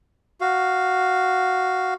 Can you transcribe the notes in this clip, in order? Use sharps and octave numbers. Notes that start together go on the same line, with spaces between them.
F#4 F5